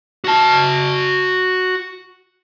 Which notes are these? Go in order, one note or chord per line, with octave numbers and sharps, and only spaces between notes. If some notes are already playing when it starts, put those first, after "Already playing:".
F#4 A5